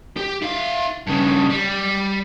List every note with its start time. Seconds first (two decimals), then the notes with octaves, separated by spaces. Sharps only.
0.17 G4
0.42 E4 F5
1.07 G2 C#3
1.50 G3